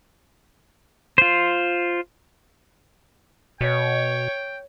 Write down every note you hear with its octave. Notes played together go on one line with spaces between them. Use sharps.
F4 C5
B2 C#5 G5